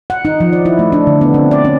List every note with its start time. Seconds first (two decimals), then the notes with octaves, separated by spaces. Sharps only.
0.10 F#5
0.25 D#4
0.40 F3
0.53 D5
0.65 E4
0.79 A3
0.92 D4
1.07 D3
1.21 B3
1.34 C4
1.51 D5
1.65 C#4